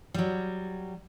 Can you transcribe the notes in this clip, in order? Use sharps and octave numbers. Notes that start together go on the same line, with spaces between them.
F#3 G3